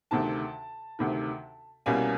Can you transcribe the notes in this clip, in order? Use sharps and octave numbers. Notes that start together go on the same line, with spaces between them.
D2 C3 D#3 A5
D2 C3 D#3
C2 B2 G3 A#3 C#4 G#5